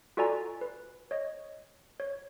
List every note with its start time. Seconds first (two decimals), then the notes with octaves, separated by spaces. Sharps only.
0.17 F4 F#4 A4 D5 G#5 A#5
0.61 B4
1.11 C#5 D#5
2.00 C#5